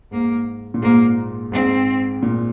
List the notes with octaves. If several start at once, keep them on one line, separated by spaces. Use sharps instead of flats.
G#2 A#3
A#2
G#2 A#3
G#2 C4
A#2